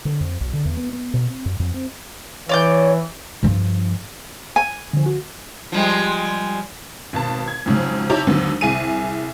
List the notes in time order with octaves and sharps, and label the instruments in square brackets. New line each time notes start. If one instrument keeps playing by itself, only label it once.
[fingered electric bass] D3
F2
B1
D3
E2
B3
B3
B2
C4
F#2
F2
C4
[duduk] E3 [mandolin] C#5 D5 G6
[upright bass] G2 F3
[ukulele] G#5
[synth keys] D3 F3
F#4
[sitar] F3 G3 G#3
[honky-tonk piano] G#1 B2 A5
G#6
F2 G#2 C#3 F#3
D#4 E4 G4 C#5 A5 A#5
D#2 G#2 D3 F#3 B3
C2 G#4 D#7